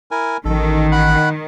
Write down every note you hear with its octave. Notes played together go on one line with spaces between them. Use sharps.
E4 A#4 G#5
A1 D#3 A4
F#5 B5 F#6